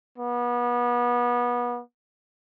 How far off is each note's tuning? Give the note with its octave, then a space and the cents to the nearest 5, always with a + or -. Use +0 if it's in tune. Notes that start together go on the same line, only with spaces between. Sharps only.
B3 -30